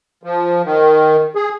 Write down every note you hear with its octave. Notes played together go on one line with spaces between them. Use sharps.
F3
D#3
G#4